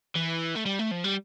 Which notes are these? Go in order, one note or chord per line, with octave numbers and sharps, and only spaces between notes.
E3
A3
G3
A3
F3
G3